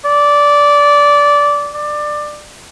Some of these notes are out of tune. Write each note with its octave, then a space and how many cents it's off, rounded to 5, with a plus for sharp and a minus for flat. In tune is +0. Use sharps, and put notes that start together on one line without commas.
D5 -15
D5 +20